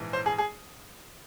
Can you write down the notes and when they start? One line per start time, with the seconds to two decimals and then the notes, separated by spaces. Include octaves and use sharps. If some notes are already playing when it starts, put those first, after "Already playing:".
Already playing: A#1 G#2 E3
0.13 C5
0.26 G#4
0.38 G#4